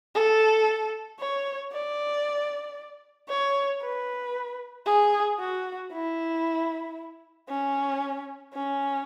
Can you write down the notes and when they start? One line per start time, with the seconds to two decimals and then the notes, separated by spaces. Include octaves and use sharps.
0.15 A4
1.20 C#5
1.72 D5
3.29 C#5
3.82 B4
4.86 G#4
5.39 F#4
5.92 E4
7.49 C#4
8.54 C#4